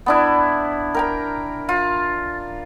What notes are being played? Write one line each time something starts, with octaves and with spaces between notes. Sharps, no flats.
B3 D4 E4
A#4 G5 A#5
F4